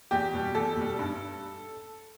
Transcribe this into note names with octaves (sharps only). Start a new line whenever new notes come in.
E2 G4
B2 G3
E2 A4
B2 G3
G2